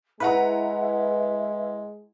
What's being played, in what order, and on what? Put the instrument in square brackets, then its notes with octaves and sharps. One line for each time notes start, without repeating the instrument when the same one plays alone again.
[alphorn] G#3 [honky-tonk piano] E4 F#5 A#5 [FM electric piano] B4 [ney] E5